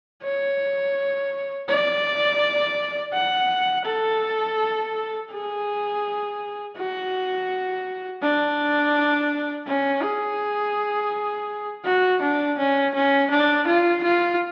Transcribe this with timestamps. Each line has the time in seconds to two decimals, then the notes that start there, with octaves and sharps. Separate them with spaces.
0.23 C#5
1.68 D5
3.13 F#5
3.85 A4
5.31 G#4
6.77 F#4
8.22 D4
9.67 C#4
10.03 G#4
11.85 F#4
12.21 D4
12.58 C#4
12.94 C#4
13.30 D4
13.67 F4
14.03 F4